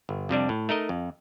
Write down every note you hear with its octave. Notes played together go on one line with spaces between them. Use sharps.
G1
F2 C3 G3 D4
A2
A3 D#4 A#4 D#5
F2